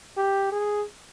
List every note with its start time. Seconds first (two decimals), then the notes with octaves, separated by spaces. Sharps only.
0.17 G4
0.52 G#4